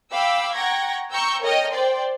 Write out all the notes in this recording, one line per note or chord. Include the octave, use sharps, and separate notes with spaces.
F5 G5 B5 D6 E6
F#5 G5 A#5 C#6 G#6 A#6
G5 A#5 C#6 E6 G6
A4 A#4 C#5 D#5 G5 F6
C5 D5 G5 C6